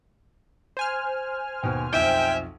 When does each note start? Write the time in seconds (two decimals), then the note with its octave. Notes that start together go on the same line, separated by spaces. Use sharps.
0.77 C5 G#5 F6
1.63 D#2 B2 G5
1.93 B1 F2 E5 G5